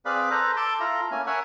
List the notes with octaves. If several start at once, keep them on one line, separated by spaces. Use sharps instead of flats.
C4 G#4 B4 D5 F5 B5
A4 B4 C5 A#5
A4 A5 C6 D6
E4 F4 A4 A#5
A3 A#3 C#4 G#5
A#4 C#5 E5 F#5 G#5